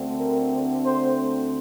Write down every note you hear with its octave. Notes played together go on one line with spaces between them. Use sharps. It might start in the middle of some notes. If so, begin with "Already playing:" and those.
Already playing: D2 D3 A3 C4
A#4
C5